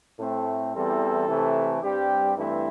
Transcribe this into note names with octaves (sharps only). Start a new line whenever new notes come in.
A2 A3 C4
E2 E3 G3 C4 A4
C3 E3 A3
G2 G3 C4 G4
G2 E3 A3 C4 E4